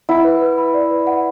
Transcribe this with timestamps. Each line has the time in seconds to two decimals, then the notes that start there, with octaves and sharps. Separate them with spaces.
0.09 E4 F#5
0.25 B4
0.41 B4
0.58 B5
0.74 D5
0.91 B4
1.07 F#5